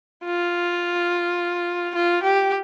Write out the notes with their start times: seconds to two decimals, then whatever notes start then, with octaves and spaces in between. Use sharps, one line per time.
0.24 F4
1.95 F4
2.23 G4